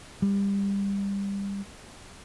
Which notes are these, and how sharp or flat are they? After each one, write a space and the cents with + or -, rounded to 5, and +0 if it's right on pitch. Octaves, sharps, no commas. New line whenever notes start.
G3 +25